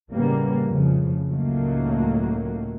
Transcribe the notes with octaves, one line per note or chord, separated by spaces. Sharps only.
A2 C#3 G3 A#3 B3
F2 A2 C#3 F3
C#2 A2 D#3 F#3 A3 A#3